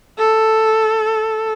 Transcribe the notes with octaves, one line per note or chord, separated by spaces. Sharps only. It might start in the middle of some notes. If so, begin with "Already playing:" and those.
A4